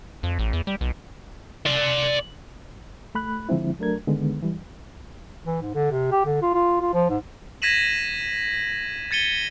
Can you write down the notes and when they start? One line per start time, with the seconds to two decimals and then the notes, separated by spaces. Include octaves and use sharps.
0.23 F2
0.39 A1
0.53 E2
0.67 G3
0.81 B1
1.66 D5 C6
3.15 A3 B5 F#6
3.49 D3 F3 G#3 C4 E4
3.79 F#3 A3 D4 A#4 G#6
4.08 D3 D#3 G#3 B3
4.42 E3 G3
5.46 E3
5.62 G#2
5.75 D3
5.91 C3
6.12 G4
6.26 D3
6.42 F4
6.54 F4
6.81 F4
6.94 F3
7.09 G#2
7.62 G#6 A#6 B6 D#7 E7 F#7
9.11 G#6 A6 C#7 D#7 G7